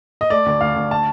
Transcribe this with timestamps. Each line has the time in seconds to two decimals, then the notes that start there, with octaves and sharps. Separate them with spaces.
0.21 D#5
0.30 A3 D5
0.46 D2
0.61 D2 F5
0.76 D2
0.91 A5